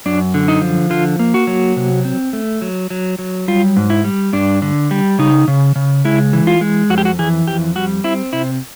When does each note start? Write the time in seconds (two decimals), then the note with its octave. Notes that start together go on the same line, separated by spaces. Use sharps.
0.06 F#2 D4
0.34 D3
0.48 D#4
0.62 F3
0.90 D3 F4
1.19 A#3
1.34 F#4
1.47 F#3
1.76 C3
2.05 C4
2.33 A3
2.62 F#3
2.90 F#3
3.19 F#3
3.48 G3 F4
3.77 G#2
3.90 E4
4.04 G3
4.33 G2 D4
4.62 D3
4.91 G3
5.19 C#3 D#4
5.48 C#3
5.75 C#3
6.05 G#3 E4
6.33 E3
6.47 F4
6.61 G#3
6.90 F2 F#4
6.98 G4
7.05 F#4
7.19 E3 G#4
7.48 F2 G4
7.76 G3 F#4
8.04 C4 E4
8.33 C3 E4